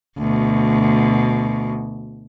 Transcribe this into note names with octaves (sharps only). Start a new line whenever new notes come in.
D2 B2